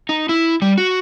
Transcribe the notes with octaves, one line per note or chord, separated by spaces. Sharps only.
D#4
E4
G3
F#4